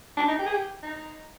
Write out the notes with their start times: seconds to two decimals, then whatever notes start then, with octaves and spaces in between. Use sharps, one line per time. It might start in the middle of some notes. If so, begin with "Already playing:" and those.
0.17 D4
0.28 D#4
0.39 G4
0.46 G#4
0.54 G4
0.83 D#4